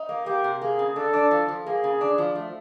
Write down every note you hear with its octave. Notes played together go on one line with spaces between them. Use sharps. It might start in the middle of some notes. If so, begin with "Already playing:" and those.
Already playing: D#4
A#3
A#3 G4
C3
A#3 G#4
C#3
D4 A4
D4
F3
F3
A#3 G#4
C#3
D4
F3
A3